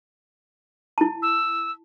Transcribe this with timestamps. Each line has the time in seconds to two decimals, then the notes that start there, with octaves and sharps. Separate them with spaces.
0.98 E4 A5
1.22 E6